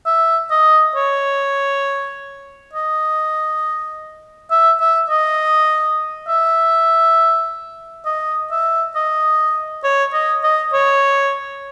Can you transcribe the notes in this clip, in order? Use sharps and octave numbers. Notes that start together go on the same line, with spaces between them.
E5
D#5
C#5
D#5
E5
E5
D#5
E5
D#5
E5
D#5
C#5
D#5
D#5
C#5